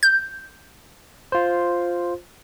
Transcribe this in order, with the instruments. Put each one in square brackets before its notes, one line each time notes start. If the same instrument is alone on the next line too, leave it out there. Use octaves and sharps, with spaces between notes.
[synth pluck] G6
[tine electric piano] F4 C5